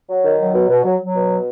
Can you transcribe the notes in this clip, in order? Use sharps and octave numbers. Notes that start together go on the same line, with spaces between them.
F#3
D#3
F#3
B2
B2
F#3
F#3
B2